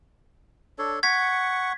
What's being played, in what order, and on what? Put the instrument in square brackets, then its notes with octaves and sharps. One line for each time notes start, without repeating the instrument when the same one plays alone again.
[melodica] D4 A4 C#5
[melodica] F#5 C#6 [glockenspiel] G#6 B6